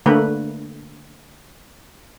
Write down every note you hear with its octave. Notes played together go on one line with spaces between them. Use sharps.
D3 A3 A#3 B4